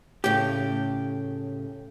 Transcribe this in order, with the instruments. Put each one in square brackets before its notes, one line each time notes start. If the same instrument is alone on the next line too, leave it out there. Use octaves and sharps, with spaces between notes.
[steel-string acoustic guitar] A2 C#3 [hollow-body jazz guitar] G4